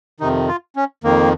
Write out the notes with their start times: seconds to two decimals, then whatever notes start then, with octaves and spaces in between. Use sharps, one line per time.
0.20 F2 C3 D#3 D#4
0.48 F4
0.76 C#4
1.04 F2 D#3 A#3